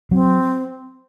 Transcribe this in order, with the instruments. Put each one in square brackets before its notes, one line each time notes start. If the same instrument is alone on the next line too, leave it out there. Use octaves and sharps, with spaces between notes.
[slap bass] F#3 [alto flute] C4